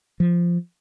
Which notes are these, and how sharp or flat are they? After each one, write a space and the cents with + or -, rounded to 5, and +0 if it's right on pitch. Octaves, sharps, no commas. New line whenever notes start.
F3 -10